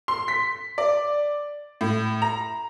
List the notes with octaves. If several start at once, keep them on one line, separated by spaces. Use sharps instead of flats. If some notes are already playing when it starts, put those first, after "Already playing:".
C6
B6
D5
A2
A#5